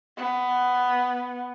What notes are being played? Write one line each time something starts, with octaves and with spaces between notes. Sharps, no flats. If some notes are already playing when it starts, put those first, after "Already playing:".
B3